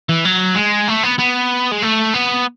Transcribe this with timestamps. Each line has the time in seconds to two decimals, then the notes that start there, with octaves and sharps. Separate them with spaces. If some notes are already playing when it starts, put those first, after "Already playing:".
0.09 E3
0.25 F#3
0.55 G#3
0.88 A3
1.03 B3
1.18 B3
1.71 G#3
1.82 A3
2.14 B3